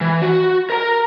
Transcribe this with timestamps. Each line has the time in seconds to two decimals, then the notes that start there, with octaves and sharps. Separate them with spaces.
0.01 E3
0.22 F#4
0.70 A#4 A#5